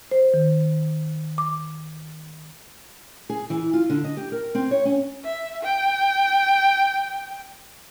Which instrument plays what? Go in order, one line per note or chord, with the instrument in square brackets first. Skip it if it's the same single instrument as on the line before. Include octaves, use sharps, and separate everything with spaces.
[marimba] C5
D#3
D6
[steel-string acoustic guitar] G#4
E3
F4
D3
D#5
G4
A#4
C4
C#5
C#4
[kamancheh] E5
G5